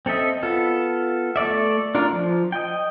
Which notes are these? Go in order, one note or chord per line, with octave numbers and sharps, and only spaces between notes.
C4 A4 D#5 E5
B3 F4 A4
A3 A4 D5 E5
D4 F4 A#4
F3
D#5 G5